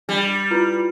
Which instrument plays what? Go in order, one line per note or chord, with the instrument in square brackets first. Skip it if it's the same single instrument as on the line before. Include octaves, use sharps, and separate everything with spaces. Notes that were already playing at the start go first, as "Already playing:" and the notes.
[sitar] G3 [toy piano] D4
[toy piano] E4 F4 B4